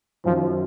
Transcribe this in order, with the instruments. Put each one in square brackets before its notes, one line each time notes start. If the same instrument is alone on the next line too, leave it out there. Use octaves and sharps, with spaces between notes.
[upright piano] F#2 D#3 F#3 [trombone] F3